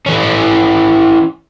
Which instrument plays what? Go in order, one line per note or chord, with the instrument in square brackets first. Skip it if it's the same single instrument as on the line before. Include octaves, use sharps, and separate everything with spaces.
[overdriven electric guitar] E3 C#4